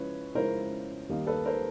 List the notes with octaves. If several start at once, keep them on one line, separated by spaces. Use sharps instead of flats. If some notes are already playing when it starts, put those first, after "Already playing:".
Already playing: C#3 F3 G#3 C#4 E4 B4 C#5
C#3 F3 G#3 C#4 E4 A#4 C5
D#2 D#3 G3 A#3 D#4
A4 B4
A#4 C5